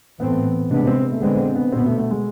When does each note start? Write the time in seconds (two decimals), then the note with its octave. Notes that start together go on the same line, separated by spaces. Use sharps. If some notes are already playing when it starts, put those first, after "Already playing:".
0.19 A2 E3 A3 B3 C4
0.71 C3 G#3 B3 D4
0.87 C4
1.12 A3
1.21 D3 G#3 B3 C4
1.55 B3
1.72 B2 B3 C4
1.86 A3
1.98 A3
2.11 G#3